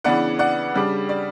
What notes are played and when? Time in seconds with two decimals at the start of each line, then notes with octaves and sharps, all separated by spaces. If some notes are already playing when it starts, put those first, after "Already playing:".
0.04 C#3 E3 B3 D4 D5 F#5
0.39 D5 F#5
0.74 C#3 G3 D4
1.09 D5